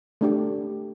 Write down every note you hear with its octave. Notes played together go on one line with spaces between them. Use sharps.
A3 D4 G4